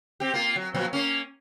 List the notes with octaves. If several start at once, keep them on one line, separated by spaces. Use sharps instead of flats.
C4 G4
A#3 F4
F#3
A#2 F3 F#3
A#3 C#4